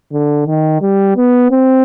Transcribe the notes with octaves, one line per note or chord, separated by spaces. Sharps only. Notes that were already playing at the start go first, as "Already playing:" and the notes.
D3
D#3
G3
B3
C4